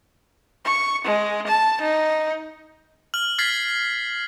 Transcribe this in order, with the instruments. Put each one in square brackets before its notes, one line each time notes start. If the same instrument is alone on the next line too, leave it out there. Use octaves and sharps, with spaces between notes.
[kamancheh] C#6
G#3
A5
D#4
[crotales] F6 F#7
F6 G#6 A6 B6 C7